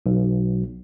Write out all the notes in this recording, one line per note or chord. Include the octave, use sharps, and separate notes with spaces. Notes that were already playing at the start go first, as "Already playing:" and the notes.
B1